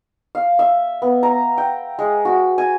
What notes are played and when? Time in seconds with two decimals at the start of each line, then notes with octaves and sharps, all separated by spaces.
0.35 F5
0.59 E5
1.02 B3
1.23 A#5
1.58 G5
1.99 G#3
2.25 F#4
2.58 G#5